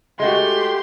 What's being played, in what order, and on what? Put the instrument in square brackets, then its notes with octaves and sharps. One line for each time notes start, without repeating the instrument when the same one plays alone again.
[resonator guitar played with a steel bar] G#3 A3 F#4 [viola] G4 C6